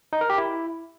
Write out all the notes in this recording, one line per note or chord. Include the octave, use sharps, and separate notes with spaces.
D#4
A#4
G4
E4